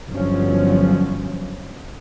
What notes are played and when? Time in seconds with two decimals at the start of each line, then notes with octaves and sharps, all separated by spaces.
0.11 G1 F3 F#3 C#4